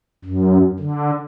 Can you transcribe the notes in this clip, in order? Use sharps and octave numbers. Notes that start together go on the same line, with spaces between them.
F#2
D3